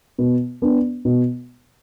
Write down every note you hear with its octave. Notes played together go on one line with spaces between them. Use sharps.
B2
B3 D4
B2